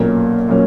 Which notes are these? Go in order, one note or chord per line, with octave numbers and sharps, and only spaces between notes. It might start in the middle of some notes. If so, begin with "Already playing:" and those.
Already playing: B1 A#2 F#3 A#3 C#4
A#2 F#3 A#3 C#4